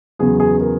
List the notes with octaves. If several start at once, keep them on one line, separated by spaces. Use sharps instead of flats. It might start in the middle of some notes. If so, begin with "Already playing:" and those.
E2 C#3 F#3 B3 G#4
G#4
A#4